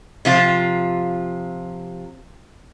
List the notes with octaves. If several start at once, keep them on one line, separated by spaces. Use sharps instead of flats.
C3 F3 F4